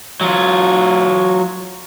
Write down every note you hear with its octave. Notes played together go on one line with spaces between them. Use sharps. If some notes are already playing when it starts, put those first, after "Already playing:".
F#3 F4